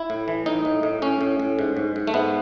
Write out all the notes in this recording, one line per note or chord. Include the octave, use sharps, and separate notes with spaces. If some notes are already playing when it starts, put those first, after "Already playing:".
Already playing: E4
A2
E3
A2 D#4
A2
A2
A2 C#4
A2
A2
G#2
G#2
G#2
A3
G#2 B3